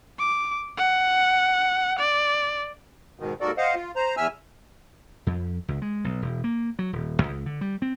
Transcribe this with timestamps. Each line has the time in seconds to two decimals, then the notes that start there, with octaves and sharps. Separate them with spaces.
0.19 D6
0.77 F#5
1.98 D5
3.19 G#2 B2 D#3
3.41 D#2 G#2 F#4 A4 A#4 D5
3.58 C5 D#5 F5 F#5
3.75 F4
3.96 C5 A#5
4.17 E2 E5 G#5 E6 F6
5.26 F2
5.68 C#2
5.82 G#3
6.04 B1
6.22 E1
6.44 A#3
6.79 F#3
6.93 D#1
7.23 C#2
7.46 D3
7.61 G3
7.82 C4